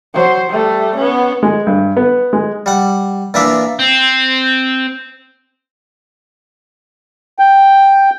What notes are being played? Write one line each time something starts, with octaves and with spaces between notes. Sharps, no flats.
F#3 C5
G3 A3
B3 C#4
G#3
G2
B3
G#3
G3 F#5
A#2 E3 A#3 D4 E5 D6
C4
G5